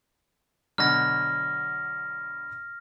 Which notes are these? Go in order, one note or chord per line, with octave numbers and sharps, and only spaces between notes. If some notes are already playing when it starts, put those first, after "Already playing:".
B2 D3 F#3 F6 A#6